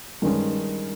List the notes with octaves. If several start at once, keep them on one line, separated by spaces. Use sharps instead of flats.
G2 D#3 G#3 C#4